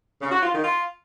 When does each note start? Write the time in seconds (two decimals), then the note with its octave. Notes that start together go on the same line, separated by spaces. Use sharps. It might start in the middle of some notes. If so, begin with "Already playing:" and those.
0.20 C#3
0.31 F#4
0.42 F4
0.52 D#3
0.63 F4